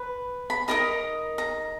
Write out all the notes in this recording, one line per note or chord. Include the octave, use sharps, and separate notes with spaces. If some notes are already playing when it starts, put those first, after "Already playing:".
Already playing: B4
B5
D#4 A#4 D#5 A#5
A#5